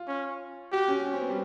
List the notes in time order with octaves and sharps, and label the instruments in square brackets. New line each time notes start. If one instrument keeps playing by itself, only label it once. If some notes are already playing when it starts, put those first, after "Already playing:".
Already playing: [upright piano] F4
[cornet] C#4
[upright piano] F#4 [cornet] G4
[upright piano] C#4
C#4
C4
B3
G3